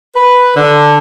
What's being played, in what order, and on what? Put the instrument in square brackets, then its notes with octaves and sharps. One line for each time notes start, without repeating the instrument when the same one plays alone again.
[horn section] B4
D3